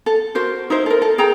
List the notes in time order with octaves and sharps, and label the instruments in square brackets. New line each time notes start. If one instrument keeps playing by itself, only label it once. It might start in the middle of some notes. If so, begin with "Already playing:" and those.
[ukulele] A4
F#4 A#4 C5
D#4 E4 C5
A4 A#4
A4
G#4 G5 A#5